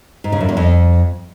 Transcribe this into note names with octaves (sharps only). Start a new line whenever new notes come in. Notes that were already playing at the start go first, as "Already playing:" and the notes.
G#2
C#3
F#2
E2
F2